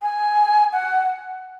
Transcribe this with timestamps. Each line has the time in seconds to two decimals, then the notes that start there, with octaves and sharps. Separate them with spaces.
0.02 G#5
0.72 F#5